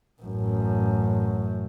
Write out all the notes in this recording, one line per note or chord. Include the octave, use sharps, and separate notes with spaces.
A1 F#2